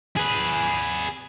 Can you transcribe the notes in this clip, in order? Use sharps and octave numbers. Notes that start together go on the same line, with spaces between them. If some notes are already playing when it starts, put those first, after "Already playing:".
G#4 B4